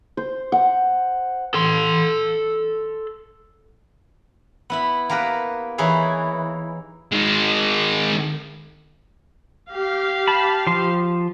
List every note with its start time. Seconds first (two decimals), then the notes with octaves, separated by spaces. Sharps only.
0.17 C5
0.52 F#5
1.54 A4 C6
4.70 B3 E4 B5
5.09 A#3 B3 G4 A#4 B4
5.78 E3 D#4 E4 G#4 C#5
7.12 D#3 G#3
9.70 G4 F5
10.28 A5 B5
10.67 F3 C6